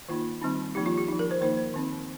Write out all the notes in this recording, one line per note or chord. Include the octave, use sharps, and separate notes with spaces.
D#3 A#3 D#4 F4
D#3 G3 C4 D#4
F3 A#3 D#4 G4
F4
G4
F3 D#4 G4
A#4
C5
D#3 A#3 D#4 C5
C5
D#3 C4 D#4